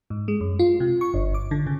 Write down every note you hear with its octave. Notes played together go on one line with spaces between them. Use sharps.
G#2
G#3
F#2
F4
C3
C#6
G1
D6
D3
C#3